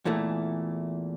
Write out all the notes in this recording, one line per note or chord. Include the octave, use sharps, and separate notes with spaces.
E2 A#2 E3 A3